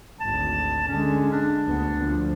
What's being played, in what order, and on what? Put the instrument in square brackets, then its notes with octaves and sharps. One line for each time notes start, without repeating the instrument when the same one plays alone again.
[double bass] G#1 D2 [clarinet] A5
[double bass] D3 G#3 [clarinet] C#4
[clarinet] D4
[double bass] D2 B3
D2 F3